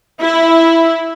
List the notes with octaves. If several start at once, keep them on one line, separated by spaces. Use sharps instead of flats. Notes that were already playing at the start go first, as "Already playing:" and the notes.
E4